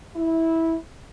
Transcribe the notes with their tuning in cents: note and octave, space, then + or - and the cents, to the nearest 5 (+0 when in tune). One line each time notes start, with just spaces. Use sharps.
E4 -15